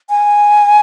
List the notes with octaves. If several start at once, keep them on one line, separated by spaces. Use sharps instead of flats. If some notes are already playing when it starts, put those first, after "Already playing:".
G#5